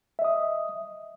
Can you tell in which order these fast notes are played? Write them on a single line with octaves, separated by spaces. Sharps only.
E5 D#5 D#6